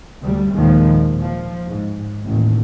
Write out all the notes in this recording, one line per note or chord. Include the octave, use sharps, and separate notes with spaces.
D2 G3
D#2 A#2 D#3 F3 G#3
A#2
F3
G#2
A1 D#2 B2